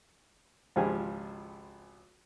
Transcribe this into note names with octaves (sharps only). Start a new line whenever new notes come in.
G#1 C#2 F3 G4 G#4 G#5